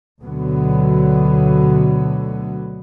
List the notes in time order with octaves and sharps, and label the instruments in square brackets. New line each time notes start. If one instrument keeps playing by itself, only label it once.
[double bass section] D2 B2 D3 F#3 B3